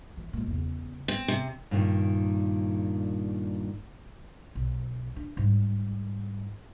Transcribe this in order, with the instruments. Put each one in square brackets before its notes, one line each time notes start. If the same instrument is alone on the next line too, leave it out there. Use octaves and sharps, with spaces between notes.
[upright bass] E3
A#2 G#3
E2 C#3
[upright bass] B3 [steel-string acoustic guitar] C4
[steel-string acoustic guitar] C3
[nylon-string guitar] G2 A#2 D#3
[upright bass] B1
D4
G#2 G3